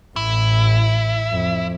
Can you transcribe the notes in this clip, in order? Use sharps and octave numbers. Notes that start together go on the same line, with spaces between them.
A1 E4
F2